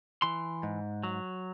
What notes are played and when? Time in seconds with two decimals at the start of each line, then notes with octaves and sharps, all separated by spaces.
0.22 E3 C6
0.63 G#2
1.03 F#3